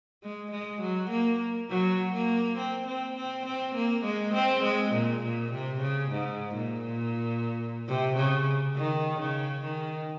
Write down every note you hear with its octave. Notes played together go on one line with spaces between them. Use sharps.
G#3
G#3
F#3
A#3
F#3
A#3
C4
C4
C4
C4
A#3
G#3
C4
G#3
A#2
A#2
C3
C#3
G#2
A#2
C3
C#3
D#3
C#3
D#3